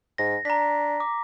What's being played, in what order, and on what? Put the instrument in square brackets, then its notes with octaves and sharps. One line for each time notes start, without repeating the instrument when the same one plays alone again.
[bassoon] G#2 [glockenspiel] A#6
[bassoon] D4 [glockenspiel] A#5 B6
[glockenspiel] D6